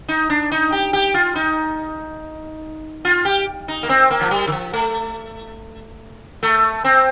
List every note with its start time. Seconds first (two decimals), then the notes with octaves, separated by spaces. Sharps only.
0.08 D#4
0.30 D4
0.51 D#4
0.72 G4
0.93 G4
1.14 F4
1.35 D#4
3.05 F4
3.25 G4
3.68 D#4
3.83 A#3
3.89 C4
4.11 A#3
4.21 F3
4.31 G3
4.47 D#3
4.52 F3
4.73 A3
6.43 A3
6.84 C4